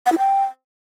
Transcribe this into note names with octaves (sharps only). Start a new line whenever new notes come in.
F#5
E4
G5